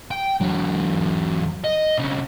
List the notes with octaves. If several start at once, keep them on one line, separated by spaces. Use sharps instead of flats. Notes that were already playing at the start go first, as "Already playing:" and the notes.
G5
E2 F#3
D#5
B1 C#3